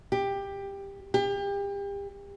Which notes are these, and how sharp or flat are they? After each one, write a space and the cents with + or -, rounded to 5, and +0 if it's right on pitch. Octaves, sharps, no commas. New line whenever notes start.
G4 +15
G4 +35